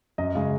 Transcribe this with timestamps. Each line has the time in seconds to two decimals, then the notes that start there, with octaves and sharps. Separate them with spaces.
0.18 F#2 D#5
0.35 C#3 G#3